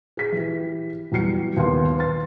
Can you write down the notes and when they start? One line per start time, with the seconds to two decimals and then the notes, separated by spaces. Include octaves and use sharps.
0.17 G#4 B6
0.32 E3 G4
1.12 E2 F#3 G3 C7 C#7
1.57 D#2 B3 F5 C6
1.98 B4 C6 A6